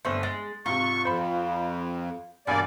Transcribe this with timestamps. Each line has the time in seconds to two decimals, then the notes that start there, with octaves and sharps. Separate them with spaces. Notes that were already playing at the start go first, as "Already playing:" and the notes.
0.05 G1 A3 D4 B4 C5
0.23 G#3 A6
0.66 G#2 C3 F4 C#6
1.05 F2 C5 B5
2.47 E1 G2 A#3 B3 D5 G#5